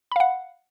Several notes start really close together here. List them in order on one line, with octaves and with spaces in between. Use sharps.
B5 F5 F#5